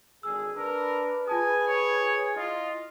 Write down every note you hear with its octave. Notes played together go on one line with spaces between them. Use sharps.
G#1 D3 G#4 E6
D4 A#4 B4 E6
F4 G#4 G#5 A5 D#6
C#5
E4 F4 D#5